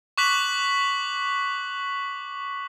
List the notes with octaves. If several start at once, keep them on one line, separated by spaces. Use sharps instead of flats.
C#6 D6 F#6 B6 F#7